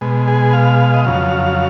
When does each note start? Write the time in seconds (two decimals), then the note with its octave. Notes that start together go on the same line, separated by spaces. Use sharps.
0.01 B2 G#3
0.28 G#4
0.53 F5
0.94 D#5
1.05 F2 C#3 F#3 F5